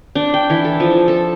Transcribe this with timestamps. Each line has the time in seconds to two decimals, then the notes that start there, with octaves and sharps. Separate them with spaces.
0.15 D4
0.34 G5
0.50 E3
0.64 A4
0.80 F3
1.08 A4